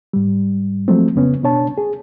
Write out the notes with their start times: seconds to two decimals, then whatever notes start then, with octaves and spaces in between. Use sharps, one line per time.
0.13 G#2 G3
0.88 F3 F#3 G#3 A3 C4
1.15 F2 C#3 B3 C#4
1.43 B2 D4 C#5 A5
1.78 G#4